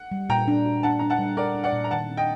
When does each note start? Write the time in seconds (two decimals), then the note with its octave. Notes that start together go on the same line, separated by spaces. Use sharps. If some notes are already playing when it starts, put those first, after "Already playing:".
Already playing: F#5
0.12 G3
0.29 A#2 G5 A#5
0.48 D4
0.66 F#4
0.83 D4 F#5 A5
0.99 D4 A#5
1.10 F#5 A5
1.19 G3
1.37 D4 A#4 D5
1.55 D4
1.64 D5 F#5
1.73 A#2
1.84 A#5
1.91 D#3 F#5 A5
2.09 C4
2.17 D#5 G5